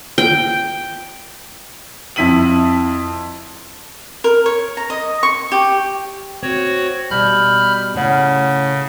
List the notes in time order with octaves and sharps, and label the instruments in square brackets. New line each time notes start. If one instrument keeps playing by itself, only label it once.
[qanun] G5
[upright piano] F2 E4 B6 D#7 F#7
[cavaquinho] A#4
C#5
A#5
D#5
C#6
G4
[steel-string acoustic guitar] C4 [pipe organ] F#4 C#5
[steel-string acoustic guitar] B2 G3 [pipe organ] B5 F6 G6
[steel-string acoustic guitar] A2 C#4 F#5 [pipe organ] C#3